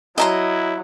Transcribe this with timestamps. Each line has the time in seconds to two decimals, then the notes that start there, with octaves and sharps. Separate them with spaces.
0.18 F#3 E4 D#5 A#5 C6